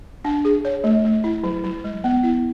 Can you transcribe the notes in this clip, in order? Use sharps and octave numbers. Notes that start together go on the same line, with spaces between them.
D4
G#4
C#5
A3
A3
E4
F#3
F#3
G#3
B3
E4